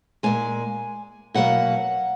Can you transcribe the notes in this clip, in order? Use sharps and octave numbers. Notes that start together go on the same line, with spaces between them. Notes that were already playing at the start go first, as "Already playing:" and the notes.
A#2 G#3 G#5
B2 F#3 A#3 F#5